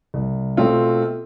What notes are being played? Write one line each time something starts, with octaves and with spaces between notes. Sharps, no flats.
C2
B2 A3 C4 F4